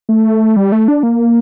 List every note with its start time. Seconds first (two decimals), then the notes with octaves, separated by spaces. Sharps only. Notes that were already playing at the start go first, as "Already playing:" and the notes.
0.09 A3
0.56 G3
0.72 A3
0.88 D4
1.03 A#3